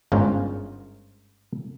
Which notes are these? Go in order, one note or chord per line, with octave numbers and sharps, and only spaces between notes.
G1 G#2 C#4 F4 A#4